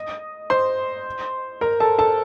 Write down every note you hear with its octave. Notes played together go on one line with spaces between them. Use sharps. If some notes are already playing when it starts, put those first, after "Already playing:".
Already playing: D#5 D#6
C5 C6
A#4 A#5
A4 A5
A4 A5